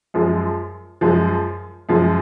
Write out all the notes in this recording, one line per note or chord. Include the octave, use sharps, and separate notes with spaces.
F#2 F3 G#3
F#2 F3 G#3
F#2 F3 G#3